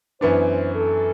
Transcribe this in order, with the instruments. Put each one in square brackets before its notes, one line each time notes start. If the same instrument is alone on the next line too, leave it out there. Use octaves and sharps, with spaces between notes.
[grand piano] F#2 E3 B3 D4 [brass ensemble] C5
[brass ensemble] A4